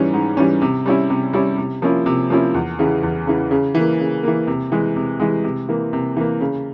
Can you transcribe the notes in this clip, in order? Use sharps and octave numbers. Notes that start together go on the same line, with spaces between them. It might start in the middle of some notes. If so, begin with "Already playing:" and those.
Already playing: G#2 E3 G3 C#4
G#2
E3 G3 C#4
C3
G3 C#4 E4
C3
G3 C#4 E4
C3
F3 A#3 C#4 E4
C3
F3 A#3 C#4 E4
E2
C#3 E3
E2
C#3 E3
C#3
E3 A#3
C#3
E3 A#3
C3
E3 G#3
C3
E3 G#3
C3
E3 A#3
C3
E3 A#3
C#3